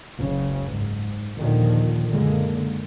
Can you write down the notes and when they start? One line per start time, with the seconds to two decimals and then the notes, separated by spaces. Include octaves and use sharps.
0.19 F#1 C#2 C#3
0.76 G#2
1.38 D#2 A#2 D3 D#3 F3
2.12 F#1 D3 G#3 A#3